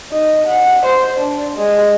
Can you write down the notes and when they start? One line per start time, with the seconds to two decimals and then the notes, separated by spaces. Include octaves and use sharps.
0.12 D#4
0.47 F#5
0.85 C5
1.20 D4
1.56 G#3